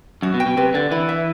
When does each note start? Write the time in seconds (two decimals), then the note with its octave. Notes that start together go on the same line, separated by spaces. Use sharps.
0.22 F#2 F#4
0.34 B2
0.40 G5
0.46 B2
0.57 C3 B4
0.74 D3 D5
0.91 E3 B5
1.09 E5